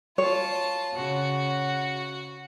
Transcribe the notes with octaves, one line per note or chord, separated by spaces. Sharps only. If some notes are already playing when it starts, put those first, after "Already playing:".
F4 C#5 A5
C#3 F#4